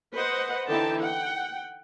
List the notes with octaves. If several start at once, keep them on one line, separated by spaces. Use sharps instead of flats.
B4 C5 D#5 F#5
D3 E3 D#4 E4 G5 A5
F#5 G5